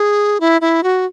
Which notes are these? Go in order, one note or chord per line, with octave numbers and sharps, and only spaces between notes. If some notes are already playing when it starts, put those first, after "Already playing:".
Already playing: G#4
E4
E4
F#4